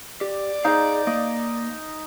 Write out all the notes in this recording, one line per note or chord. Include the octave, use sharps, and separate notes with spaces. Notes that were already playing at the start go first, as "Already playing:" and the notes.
G4 D5
D#4 G#4 C5 F5
A#3 D#5